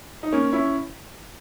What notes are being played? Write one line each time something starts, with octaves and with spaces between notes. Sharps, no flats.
D#4
A#3 C#4
C#4 E4